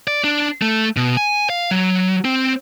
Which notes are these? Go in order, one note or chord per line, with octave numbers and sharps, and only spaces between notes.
D5
D4
A3
B2
G#5
F5
F#3
C4